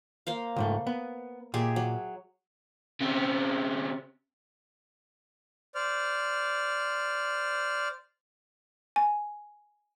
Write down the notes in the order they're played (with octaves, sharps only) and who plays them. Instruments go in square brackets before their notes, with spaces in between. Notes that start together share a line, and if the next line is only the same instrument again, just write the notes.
[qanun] A#3 C5 F5
[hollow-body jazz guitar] C#2 G#2 A3
B3
[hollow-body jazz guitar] A#2 [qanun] G4 G#4 E5
[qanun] F#3
[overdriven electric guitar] C#3 C4
[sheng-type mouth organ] C5 D5 F6
[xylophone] G#5